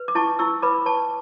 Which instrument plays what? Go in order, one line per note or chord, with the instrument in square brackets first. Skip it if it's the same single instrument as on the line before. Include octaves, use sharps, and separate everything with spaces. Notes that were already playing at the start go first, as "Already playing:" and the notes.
Already playing: [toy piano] B4
D6
E4 A5 C#6
E4 C#6 E6
B4 B5 D6
B4 A5 C#6